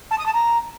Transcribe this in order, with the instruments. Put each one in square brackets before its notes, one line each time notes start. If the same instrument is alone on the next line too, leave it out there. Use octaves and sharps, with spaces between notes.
[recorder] A5
D#6
A5
A#5